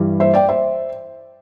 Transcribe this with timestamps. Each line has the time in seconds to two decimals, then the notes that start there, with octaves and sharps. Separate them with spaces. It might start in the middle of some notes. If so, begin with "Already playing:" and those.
Already playing: G2 E3 G3
0.20 C5 E5
0.34 D5 G5
0.49 C5 E5